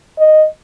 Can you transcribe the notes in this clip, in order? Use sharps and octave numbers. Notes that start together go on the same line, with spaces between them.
D#5